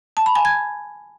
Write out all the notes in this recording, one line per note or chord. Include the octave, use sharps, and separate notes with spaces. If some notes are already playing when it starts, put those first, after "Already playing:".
A5
B5
G#5
G#6